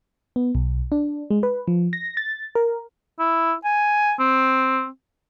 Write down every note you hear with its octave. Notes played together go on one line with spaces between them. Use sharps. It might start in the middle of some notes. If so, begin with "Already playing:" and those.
B3
B1
D4
G#3
B4
F3
A#6
A6
A#4
E4
G#5
C4